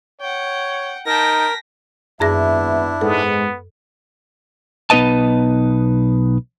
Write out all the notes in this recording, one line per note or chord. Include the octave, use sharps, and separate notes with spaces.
C#5 F#5 G5
D#4 A#4 G5 A5 A#6 B6
G#1 F#2 B3 D4 E4 G#4 E5 A#6
G#2 G#3 B3 A4
B1 B3 D#4 B4 D#5 A5